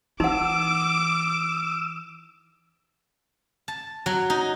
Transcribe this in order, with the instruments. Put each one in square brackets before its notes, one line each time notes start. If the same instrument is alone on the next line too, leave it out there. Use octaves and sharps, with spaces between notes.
[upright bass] E3 [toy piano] D#4 F#5 [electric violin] D6 [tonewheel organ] E6
[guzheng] A5
F#3
D#4